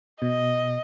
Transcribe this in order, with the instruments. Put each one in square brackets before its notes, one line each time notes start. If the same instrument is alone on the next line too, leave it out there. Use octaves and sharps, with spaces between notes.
[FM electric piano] B2 [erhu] D#5